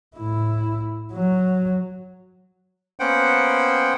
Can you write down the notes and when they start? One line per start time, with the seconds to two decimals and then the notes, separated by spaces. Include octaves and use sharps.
0.17 A2 E4
1.13 F#3
2.99 A#3 B3 C#4 C5 F#5 G5